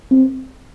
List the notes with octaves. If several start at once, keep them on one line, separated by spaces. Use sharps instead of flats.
C4